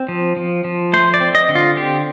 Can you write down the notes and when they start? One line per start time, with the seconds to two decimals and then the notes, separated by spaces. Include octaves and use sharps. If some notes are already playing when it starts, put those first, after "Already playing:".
Already playing: C4
0.08 F3
0.37 F3
0.64 F3
0.93 A3 C5
1.14 D5
1.20 C4
1.35 D#5
1.49 D3
1.55 F4
1.77 C4 G4